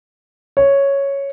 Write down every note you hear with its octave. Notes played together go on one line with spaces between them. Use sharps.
C#5